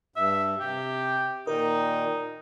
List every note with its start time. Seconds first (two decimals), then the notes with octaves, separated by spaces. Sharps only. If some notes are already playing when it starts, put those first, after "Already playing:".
0.16 G2 E5
0.60 C3 G4
1.47 A#2 D#3 D#4 A#4